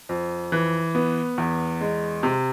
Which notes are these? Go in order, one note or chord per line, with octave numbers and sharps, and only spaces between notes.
F2
E3
B3
E2
G#3
C3